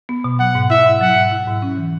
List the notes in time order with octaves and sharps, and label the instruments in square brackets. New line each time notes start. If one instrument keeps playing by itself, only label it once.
[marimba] B3
B2
[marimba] F#3 [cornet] F#5
[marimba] G#2
[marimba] E4 [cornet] E5
[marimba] G#2
[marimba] F#3 [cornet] F#5
[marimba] G#2
E4
G#2
C#4
E3